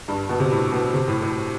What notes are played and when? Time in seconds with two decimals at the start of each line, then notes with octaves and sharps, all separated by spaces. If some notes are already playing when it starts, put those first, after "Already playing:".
0.08 G2
0.29 B2
0.40 C3
0.51 A2
0.72 B2
0.94 C3
1.08 A2
1.22 A2